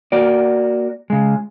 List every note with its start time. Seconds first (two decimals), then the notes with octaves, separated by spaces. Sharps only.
0.12 A#3 F#4 D5
1.10 C#3 G#3